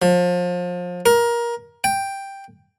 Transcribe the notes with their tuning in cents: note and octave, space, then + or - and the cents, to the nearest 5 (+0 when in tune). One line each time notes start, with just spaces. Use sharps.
F3 +30
A#4 +20
G5 +5